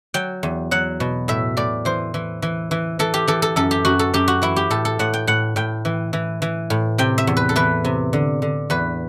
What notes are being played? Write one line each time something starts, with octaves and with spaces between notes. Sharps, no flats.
F#3 G5
E2
F#3 F#5
B2
A2 E5
A2 D5
E3 C5
E3
E3
E3
E3 A4
G4
E3 A4
A4
F#2 A4
G4
F#2 F#4
A4
F#2 G4
F#4
E3 E4
G4
A2 A4
A4
A2 F#5
G5
A2 F#5
A2 G5
E3
E3
E3
A2
C3 G5
E5
E2
B4
A4
E3 B4
C3
D3
D3
E2 B4